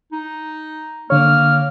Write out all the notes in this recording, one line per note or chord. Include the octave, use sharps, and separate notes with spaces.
D#4
D3 A#3 C#5 F6